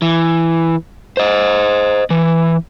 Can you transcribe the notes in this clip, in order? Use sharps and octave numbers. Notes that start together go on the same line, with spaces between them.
E3
C5 D#5
E3